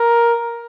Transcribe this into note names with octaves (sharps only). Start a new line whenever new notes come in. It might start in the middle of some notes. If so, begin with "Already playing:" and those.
Already playing: A#4